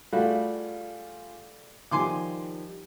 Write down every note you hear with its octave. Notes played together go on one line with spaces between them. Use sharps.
G3 A3 F4 F#4 G#4 F5
D#3 F3 G3 G#5 C6 D6